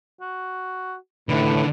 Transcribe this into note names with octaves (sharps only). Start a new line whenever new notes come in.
F#4
A2 D3 D#3 B4